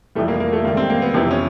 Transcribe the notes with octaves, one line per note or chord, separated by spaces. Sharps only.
F2 C3 E3 G3 A3
A#3
A#3
A3
G#2 D#3 G3 A#3
C4
A#3
B3
F2 C3 E3 C4
C#4